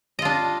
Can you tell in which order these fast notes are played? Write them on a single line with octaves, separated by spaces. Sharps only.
D#5 F4 D4